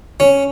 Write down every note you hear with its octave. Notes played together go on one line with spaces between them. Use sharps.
C#4